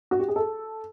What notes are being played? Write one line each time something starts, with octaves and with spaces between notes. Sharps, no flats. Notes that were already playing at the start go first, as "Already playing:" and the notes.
F#4
G4
G#4
A4